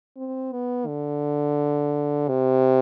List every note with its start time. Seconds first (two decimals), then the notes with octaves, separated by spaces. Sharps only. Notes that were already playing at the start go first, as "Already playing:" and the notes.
0.17 C4
0.52 B3
0.87 D3
2.28 C3